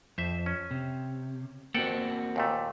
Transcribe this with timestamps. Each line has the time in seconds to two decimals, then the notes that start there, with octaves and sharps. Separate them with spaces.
0.18 F2 C5 E5
0.46 C#4
0.71 C3
1.74 A#3 C4 F#4 A4 F#5 G5
2.36 D#2 A#2 A3